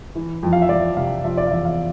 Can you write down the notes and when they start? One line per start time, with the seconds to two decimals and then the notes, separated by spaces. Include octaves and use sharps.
0.15 E3
0.43 F2
0.53 F5
0.62 E5
0.69 F2 D5
0.97 C3 F5
1.24 F3 E5
1.37 D5
1.47 F5
1.51 E2 E5
1.65 F5